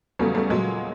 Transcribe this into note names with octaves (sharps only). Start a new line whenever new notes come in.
E2 C#3 F#3 G3 A3
G3 A3
A#2 F#3 G#3